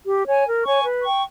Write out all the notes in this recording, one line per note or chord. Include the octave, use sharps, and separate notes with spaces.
G4
C#5 G#5
A#4
C#5 G#5 C#6
B4
G5 C#6